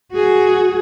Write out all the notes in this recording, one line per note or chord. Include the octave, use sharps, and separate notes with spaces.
F#4 G#4